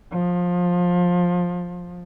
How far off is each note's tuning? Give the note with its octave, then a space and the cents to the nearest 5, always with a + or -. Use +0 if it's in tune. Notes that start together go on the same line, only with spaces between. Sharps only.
F3 +20